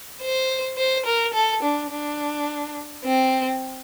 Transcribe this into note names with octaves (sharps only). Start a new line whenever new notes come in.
C5
C5
A#4
A4
D4
D4
C4